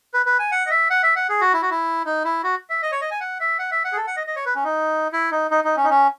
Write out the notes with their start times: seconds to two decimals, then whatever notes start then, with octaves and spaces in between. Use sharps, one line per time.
0.14 B4
0.26 B4
0.39 G#5
0.51 F#5
0.66 D#5
0.71 E5
0.90 F#5
1.03 E5
1.16 F#5
1.29 G#4
1.41 F#4
1.54 E4
1.62 F#4
1.70 E4
2.06 D#4
2.24 E4
2.44 F#4
2.70 E5
2.82 D#5
2.92 C#5
3.01 D#5
3.11 G#5
3.21 F#5
3.40 E5
3.59 F#5
3.71 E5
3.85 F#5
3.92 G#4
3.97 A4
4.07 F#5
4.17 D#5
4.27 D#5
4.36 C#5
4.46 B4
4.55 C#4
4.64 D#4
5.13 E4
5.32 D#4
5.51 D#4
5.64 D#4
5.77 C#4
5.84 D#4
5.90 C#4